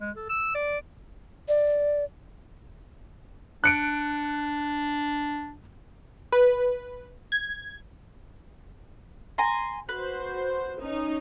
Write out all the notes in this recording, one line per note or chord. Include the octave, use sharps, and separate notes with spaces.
G#3
A4
E6
D5
D5
D4 F#6 C#7 D7
B4
G#6
G#5 A#5 C6
F#4 B4 C5
C#4 D#4